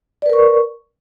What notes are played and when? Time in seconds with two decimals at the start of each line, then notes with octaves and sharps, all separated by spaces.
0.22 D5
0.26 B4
0.30 A#4
0.33 C#6